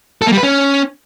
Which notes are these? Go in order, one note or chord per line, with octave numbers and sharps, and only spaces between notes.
A4
A#3
G3
B4
C#4